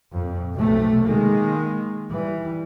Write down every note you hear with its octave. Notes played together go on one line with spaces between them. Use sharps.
F2 A#2
B1 C3 A3
D#3 G#3 A#3
E3 G3